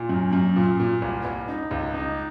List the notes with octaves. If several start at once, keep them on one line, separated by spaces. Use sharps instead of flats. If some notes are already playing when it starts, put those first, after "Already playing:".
Already playing: A#2
F#2
F#2
A#2
A#2
C2
C2
D#4
C#2
D#4